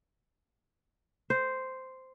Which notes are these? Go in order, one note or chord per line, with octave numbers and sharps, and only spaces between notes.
C5